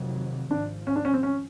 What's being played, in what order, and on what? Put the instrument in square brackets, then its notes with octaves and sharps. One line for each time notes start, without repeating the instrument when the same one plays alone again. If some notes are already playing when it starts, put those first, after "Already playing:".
Already playing: [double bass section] F1 F2 C3 D#3 F#3
[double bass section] G#1 G#2 F3 [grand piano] D4
[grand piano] C#4
D4
C#4
C4
C#4